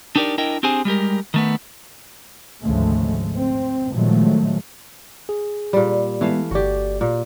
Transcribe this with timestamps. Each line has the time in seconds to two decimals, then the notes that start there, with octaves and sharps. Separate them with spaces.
0.16 D4 D#4 G4 A#4 C#5 D5
0.38 D4 E4 A#4 D#5 G5
0.63 C4 D4 G4 G#4 C5 G#5
0.85 G3 G#3 G4 A#4
1.34 D#3 A3 B3
2.62 G#1 D2 C#3 F3 G#3 A3
3.35 C4
3.92 A#2 D#3 F3 F#3 G#3 A3
5.29 G#4
5.73 A#2 G3
6.21 E3 G#3 A3 B3 F5
6.51 G1 F#4 G4 D5
7.01 A#2